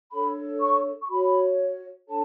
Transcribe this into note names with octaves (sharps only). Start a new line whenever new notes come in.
D4 A4 C#5 B5
C#6
C#6
F#4 C#5 B5
D4 A4 C#5 A5